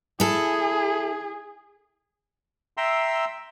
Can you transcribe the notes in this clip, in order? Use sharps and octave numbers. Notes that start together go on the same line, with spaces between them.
E4 G#4 A4
E5 G5 A#5 C6 E6